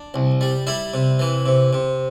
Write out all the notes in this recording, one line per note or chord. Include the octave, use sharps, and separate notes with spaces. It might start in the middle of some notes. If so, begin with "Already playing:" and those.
Already playing: D4
C2
G3
G3 E4
C3
E3
C3
C3